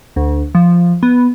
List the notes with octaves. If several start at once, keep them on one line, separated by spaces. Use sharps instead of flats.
D2
F3
B3